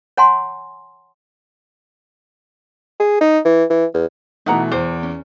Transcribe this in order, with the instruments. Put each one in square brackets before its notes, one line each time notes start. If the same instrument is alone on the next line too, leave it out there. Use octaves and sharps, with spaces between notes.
[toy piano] C#5 F#5 G#5 A#5 C6
[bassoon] G#4
D#4
E3
E3
E2
[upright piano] B2 E3 A3 [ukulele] D#4 F#5 A#5
[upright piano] E2 [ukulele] C5
[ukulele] C#4